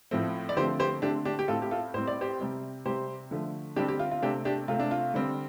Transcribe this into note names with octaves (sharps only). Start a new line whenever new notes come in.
A2 F3 A3 C4
D5
D3 F3 A3 C4 G4 C5
G4 C5
D3 A3 C4 D4 G4
D4 G4
G4
A2 A3 C4 F4 A4
G4
F4 A4
A2 G3 C4 C5
D5
G4 C5
C3 G3 C4
C3 G3 C4 G4 C5
D3 F3 A3
D3 G3 C4 D4 G4
G4
F4
F4
C3 A3 C4 D4 G4
D4 G4
C3 A3 C4 F4
D4
F4
D3 G3 C4